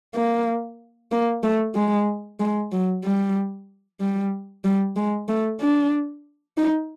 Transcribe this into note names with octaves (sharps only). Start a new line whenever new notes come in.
A#3
A#3
A3
G#3
G#3
F#3
G3
G3
G3
G#3
A3
D4
D#4